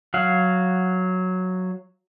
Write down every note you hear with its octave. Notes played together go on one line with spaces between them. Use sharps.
F#3 F5 F#5